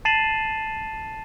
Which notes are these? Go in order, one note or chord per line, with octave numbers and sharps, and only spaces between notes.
A5 A6 C7 D#7 E7 F#7